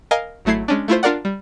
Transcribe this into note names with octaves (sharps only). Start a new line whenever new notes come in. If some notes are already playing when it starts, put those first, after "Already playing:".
A#4 D#5 F5 G#5
G#1 F#3 A3 E4 G#6 C7
G#3 C#4 D4
A3 E4 F4 C5
D4 F4 A#4 D5 F#5
G3